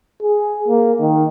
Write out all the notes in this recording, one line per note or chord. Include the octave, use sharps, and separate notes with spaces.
G#4
A#3
D#3